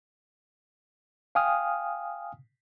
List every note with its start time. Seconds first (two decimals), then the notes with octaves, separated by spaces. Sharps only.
1.35 F5 G5 G#5 D#6 F6